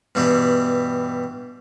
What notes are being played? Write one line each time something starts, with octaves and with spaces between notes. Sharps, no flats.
G2 B2 E3 G3 B3